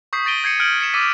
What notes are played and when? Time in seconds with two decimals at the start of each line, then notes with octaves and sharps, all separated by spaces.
0.13 C#6 D#6 G6 B6 C7
0.25 C#6 A6 A#6 D7 D#7 G7
0.44 G6 G#6 C7 C#7 D#7
0.60 F6 G6 G#6 C#7 D7 F#7
0.80 B6 C#7 E7
0.94 D6 E6 A6 B6 D#7